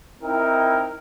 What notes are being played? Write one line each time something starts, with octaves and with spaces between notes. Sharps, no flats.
C4 D#4 E4 A#4 G5